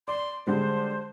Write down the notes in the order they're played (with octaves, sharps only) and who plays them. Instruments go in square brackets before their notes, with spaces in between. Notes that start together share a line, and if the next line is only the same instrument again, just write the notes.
[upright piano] D5 [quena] C6
[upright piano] D3 G3 G#3 [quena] C5